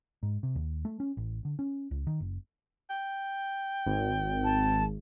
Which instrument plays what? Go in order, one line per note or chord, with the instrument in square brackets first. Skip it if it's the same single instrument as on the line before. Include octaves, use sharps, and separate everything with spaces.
[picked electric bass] G#2
C3
D#2
A3
C#4
A1
D3
C#4
C#2
D#3
F#1
[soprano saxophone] G5
[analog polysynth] G#1
[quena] A5